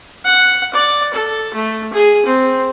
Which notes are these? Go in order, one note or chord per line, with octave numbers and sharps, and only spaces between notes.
F#5
D5
A4
A3
G#4
C4